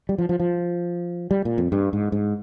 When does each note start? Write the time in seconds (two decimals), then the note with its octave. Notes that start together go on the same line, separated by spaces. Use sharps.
0.09 G3
0.18 F3
0.29 F3
0.40 F3
1.31 G3
1.45 A#2
1.58 F2
1.72 G2
1.93 G#2
2.12 G#2